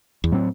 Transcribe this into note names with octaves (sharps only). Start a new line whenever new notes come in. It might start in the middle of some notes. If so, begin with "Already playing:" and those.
E2
A2 F#3 C4